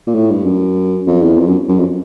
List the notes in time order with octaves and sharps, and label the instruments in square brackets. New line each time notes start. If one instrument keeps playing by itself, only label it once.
[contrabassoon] A#2
A2
G2
F#2
F2
E2
F2
F#2
F#2
F2